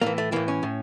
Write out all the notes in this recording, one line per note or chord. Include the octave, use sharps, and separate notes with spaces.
A2 E3 A#3
A3
A2 E3 A#3
C#4
A2